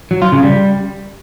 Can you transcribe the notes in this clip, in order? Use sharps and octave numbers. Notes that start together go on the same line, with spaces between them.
F#3
F4
C#3
G3